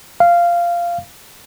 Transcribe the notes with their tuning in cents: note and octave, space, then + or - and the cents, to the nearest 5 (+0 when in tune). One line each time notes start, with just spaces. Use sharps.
F5 -10